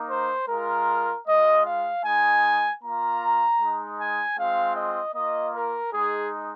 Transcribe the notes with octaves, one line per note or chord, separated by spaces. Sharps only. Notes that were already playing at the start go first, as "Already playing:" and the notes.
Already playing: A#3 D#4
C5
G#3 F4 A#4
G#3 F4 D#5
F5
G#3 D#4 G#5
A#3 F4 A#5
G#3 D#4
G#5
G#3 C4 F4 F5
D#5
A#3 F4 D#5
A#4
G#3 D#4 G#4